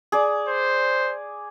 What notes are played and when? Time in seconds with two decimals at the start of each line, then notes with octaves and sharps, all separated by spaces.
0.12 G#4 D5
0.49 C5